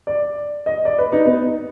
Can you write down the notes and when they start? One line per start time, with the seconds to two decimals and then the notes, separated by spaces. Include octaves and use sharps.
0.07 D5
0.66 D#5
0.85 D5
0.99 B4
1.12 D#4
1.26 B3